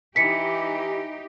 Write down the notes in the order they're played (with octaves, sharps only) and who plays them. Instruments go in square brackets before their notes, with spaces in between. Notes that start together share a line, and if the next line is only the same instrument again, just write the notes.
[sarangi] E3 [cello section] D#4 G4 [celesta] B6 C#7